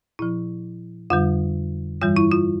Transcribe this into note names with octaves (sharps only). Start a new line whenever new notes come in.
A#2 F3 E4
F2 D3 G3 F4
G2 E3 G3 F4
E4
F4